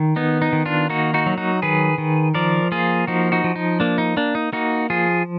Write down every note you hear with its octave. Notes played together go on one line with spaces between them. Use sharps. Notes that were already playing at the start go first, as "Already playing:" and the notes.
Already playing: D#3
B3 D#4
D#4
D#3
D4 F4
A#3 D#4 F#4
D#4 F#4
F#3
D#4 F#4
D#3 G#4 B4
D#3
F3 A#4 D5
A#3 F4 G#4
F3 D#4 F#4
D#4 F#4
F3
D#4
A#3 D4
D#4
A#3 D4
D#4
A#3 D#4 F#4
F3 F4 G#4